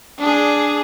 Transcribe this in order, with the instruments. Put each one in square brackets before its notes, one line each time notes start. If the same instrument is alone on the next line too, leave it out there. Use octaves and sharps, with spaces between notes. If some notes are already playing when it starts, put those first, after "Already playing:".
[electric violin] D4 G#4